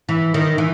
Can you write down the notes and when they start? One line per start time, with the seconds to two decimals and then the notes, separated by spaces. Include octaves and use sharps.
0.09 E3
0.34 D#3
0.58 E3